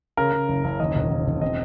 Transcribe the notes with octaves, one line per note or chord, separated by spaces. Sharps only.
C#3 A#4
C#3
F#1
F#1
D#2 D#5
E1
D#2
E1
C4 D#5